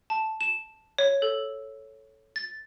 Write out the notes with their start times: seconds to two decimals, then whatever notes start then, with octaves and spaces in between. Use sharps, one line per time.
0.10 A5
0.41 E7
0.98 C#5
1.22 A4
2.36 A6